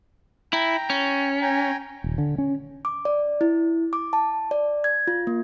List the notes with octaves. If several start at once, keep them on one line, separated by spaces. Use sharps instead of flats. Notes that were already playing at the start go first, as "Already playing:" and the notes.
E4 G5 A#5
C#4
G5 G#5 A#5
D#1
D3
C#4
D6
D5
E4
D6
A5
D5
G#6
F4
A#3